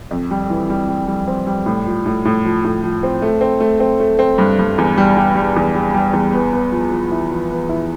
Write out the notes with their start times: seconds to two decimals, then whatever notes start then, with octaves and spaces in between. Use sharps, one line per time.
0.11 F2
0.31 G3
0.50 E3
0.70 G3
0.88 G3
1.07 G3
1.28 C4
1.47 G3
1.66 A2
1.86 F3
2.06 A2
2.25 A2
2.45 F3
2.64 A2
2.83 F3
3.03 C4
3.22 A3
3.41 C4
3.60 A3
3.80 C4
4.00 A3
4.19 C4
4.38 G2
4.59 G2
4.78 E2
4.98 G3
5.17 G3
5.36 G3
5.56 E2
5.75 G3
5.94 G3
6.13 E2
6.33 B3
6.53 B3
6.72 F3
6.92 F3
7.11 E4
7.31 F3
7.51 B3
7.69 E4